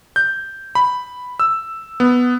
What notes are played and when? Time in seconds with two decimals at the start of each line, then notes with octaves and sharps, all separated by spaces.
0.16 G6
0.75 B5
1.40 E6
2.00 B3